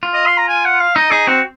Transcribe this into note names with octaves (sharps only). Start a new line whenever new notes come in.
F4
D#5
C6
A#5
G#5
F#5
F5
D#4 D#5
D#4 G#4
C4 F#4